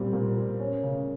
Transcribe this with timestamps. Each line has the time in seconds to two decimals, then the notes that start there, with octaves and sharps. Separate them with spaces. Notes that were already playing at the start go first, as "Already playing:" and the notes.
Already playing: A#2 G3 C4
0.13 A#2
0.37 A#2
0.60 C#4
0.83 C#3